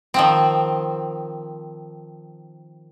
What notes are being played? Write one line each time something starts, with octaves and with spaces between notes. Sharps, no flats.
D#3 F3 C4